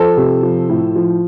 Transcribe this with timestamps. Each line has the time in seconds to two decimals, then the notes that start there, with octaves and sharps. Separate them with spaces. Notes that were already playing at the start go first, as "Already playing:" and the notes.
Already playing: F3 A4 C5
0.17 C3
0.43 F3
0.69 A2
0.96 F3